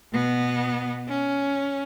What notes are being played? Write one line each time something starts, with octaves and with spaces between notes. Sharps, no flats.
B2 B3
C#4